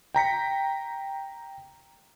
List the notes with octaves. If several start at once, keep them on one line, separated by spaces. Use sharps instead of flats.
G5 A#5 B6 C#7